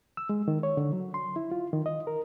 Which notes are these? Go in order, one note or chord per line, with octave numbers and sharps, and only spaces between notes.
E6
G#3
D#3
C#5
D3
F#3
C6
E4
F4
D#3
D#5
A#4